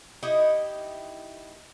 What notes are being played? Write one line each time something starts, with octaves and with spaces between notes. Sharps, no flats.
D#4 E4 G4 D#5